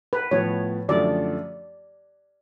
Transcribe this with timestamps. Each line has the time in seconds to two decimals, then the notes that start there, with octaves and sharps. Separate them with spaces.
0.13 B4
0.31 A2 F3 B3 C#5
0.89 F#2 D3 F3 A3 C#4 D5